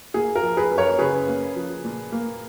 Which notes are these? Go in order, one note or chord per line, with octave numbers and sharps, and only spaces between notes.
A#3 G#4
A#4
F3
G#4 B4
F#2
A#4 C#5
C#3 G#4 B4
A#3
F3
A#2
A#3